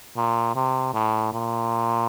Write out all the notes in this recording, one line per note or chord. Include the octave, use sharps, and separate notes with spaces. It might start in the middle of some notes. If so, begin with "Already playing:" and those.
A#2
C3
A2
A#2